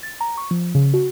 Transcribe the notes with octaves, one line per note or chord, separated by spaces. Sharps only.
A6
A#5
C#6
F3
C#3
F#4